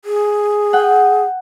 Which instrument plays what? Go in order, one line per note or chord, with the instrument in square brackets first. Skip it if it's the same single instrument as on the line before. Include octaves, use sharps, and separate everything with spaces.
[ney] G#4
[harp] F#5 G5